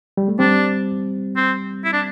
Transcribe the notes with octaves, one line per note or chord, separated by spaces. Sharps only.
G3
A3
G3 C4 D4
C4
E4
D4